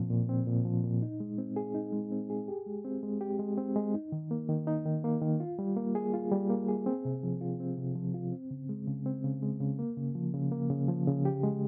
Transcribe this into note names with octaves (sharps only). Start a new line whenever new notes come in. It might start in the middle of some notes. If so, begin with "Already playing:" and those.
Already playing: A#2 F3 C4
A#2
C4
A#2
F3
A#2
D#4
G#3
C4
G#4
D#4
G#3
C4
G#4
G4
G#3
C4
G#3
G4
G#3
C4
G#3
D#4
D#3
A#3
D#3
D#4
D#3
A#3
D#3
F4
G3
A#3
G#4
F4
G3
A#3
G#4
C4
C3
F3
F4
C4
C3
F3
F4
C4
C#3
G#3
C#3
C4
C#3
G#3
C#3
A#3
C#3
F3
C#3
A#3
C#3
F3
C#3
G4
G#3